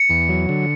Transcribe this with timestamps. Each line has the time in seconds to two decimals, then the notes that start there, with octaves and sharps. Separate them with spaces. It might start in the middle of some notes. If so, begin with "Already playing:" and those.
Already playing: C#7
0.09 E2
0.29 F#3
0.49 D3